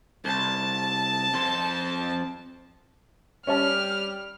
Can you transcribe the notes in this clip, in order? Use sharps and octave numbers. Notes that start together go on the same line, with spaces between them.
C2 A5
F2 C5
G3 C#4 C#5 A5 F6